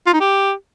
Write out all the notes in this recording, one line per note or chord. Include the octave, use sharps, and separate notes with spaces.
F4
D#4
G4